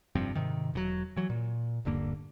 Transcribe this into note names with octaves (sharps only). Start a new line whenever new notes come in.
F1 G2 F3 C4
G#2 C3 D#3
E1 C3 F#3
E3 F#3
A#2
D#1 G2 D3 A#3